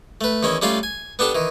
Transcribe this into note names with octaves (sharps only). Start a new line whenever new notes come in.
A3 B4
E2 D#3 C#4 E4
G3 A3 C#4 F4 D5 F5
G#5
B3 D4 G4 A4
D#3 E3